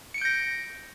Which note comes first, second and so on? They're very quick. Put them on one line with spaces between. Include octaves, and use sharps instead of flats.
C#7 D7 G6 A#6